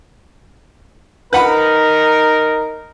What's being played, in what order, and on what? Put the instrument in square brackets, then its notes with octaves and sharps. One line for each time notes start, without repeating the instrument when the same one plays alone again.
[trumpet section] D#4 A#4 [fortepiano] B4 F#5 B5